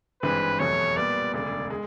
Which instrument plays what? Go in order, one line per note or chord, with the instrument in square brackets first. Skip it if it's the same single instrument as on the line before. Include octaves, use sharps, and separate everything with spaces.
[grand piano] G#1 G2 E3 G#3 C4 [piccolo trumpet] B4
[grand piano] F1 E2 B2 F#3 A3 [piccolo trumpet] C#5
[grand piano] A#2 G3 B3 [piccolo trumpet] D5
[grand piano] E1 D2 C#3 [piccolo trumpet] D5
[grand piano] G#3